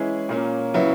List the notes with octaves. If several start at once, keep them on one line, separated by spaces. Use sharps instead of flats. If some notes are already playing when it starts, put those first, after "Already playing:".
Already playing: E3 G#3 C#4 E4 G#4
A#2 A#3 C#4
C#3 F#3 B3 E4